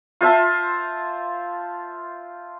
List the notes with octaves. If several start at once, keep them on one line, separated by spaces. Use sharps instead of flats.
F4 C5 E5 A5